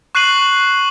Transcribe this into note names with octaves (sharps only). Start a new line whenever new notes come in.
C#6 F#6 C7 D#7 F#7